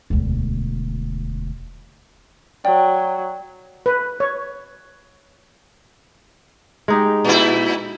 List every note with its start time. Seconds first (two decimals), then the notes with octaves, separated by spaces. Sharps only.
0.10 E1 D2
2.65 F#3 D5 G5
3.86 B4
4.20 C#5
6.88 G#3 D#4 G4
7.25 A#2 E4